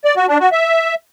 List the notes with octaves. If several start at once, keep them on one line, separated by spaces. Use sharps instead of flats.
D5
F#4
D4
F#4
E5